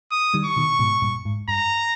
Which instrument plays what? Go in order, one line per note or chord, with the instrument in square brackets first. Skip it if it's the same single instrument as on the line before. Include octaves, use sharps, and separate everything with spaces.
[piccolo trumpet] D#6
[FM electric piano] D#3 G3
[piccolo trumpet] C#6
[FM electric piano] B2 D#3
G#2 B2
G2 A#2
G#2
[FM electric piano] G2 [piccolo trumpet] A#5